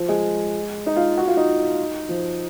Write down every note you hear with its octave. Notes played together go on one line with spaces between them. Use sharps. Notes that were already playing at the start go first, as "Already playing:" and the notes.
Already playing: F3
G#3
D#4
F4
F#4
F4
D#4
F3